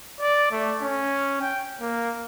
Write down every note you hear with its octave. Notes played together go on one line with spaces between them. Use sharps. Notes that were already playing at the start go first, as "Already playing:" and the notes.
D5
A3
C#4
G5
A#3